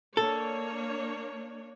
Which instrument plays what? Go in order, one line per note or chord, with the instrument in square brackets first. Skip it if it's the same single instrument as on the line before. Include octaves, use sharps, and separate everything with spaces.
[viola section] A#3 D4 C#5 [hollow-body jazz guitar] A4